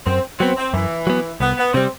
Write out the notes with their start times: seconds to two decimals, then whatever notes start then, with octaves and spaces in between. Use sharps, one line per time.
0.06 F#2 C4
0.40 F#3 B3 C4
0.57 C4
0.74 F#2 E3
1.07 F#3 B3
1.40 C2 B3
1.58 B3
1.74 C3 G3 C4